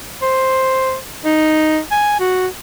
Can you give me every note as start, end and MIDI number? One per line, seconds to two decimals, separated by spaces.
0.22 0.96 72
1.25 1.80 63
1.91 2.17 80
2.20 2.47 66